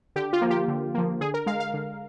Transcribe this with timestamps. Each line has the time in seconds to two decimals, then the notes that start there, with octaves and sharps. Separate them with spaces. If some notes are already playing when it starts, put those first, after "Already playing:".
0.16 D3 G4
0.33 F4
0.41 F3 A#3
0.50 G4
0.68 D3
0.94 F3 A#3
1.21 D3 G#4
1.34 A#4
1.46 G#3 F5
1.60 F5
1.74 D3